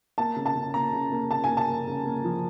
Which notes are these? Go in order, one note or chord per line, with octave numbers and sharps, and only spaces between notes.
A#3 A5
C#3
A5
C#3
A#3 A#5
C#3
A#3
C#3 A5
G#5
A#3
A5
A#3
C#3
A#3
F3